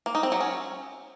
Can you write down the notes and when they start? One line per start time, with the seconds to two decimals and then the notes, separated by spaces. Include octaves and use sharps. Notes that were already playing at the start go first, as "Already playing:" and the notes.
0.06 A#3
0.15 D#4
0.23 C4
0.32 F#3
0.40 C#4